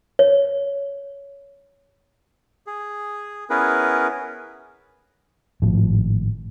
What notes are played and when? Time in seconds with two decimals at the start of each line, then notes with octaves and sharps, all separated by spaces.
0.19 C#5
2.67 G#4
3.50 B3 C#4 E4 G#4 A#4 B4
5.62 G#1 A2 F3